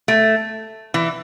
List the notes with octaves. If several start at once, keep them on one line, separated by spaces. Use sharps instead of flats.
A3
E3